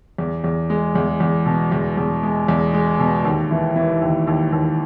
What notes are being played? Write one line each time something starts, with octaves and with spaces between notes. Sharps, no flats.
E2
E2
G#3
E2
E2
B2
E2
E2
G#3
E2
G#3
B2
D#2
E3
E3
D#2
D#2
D#2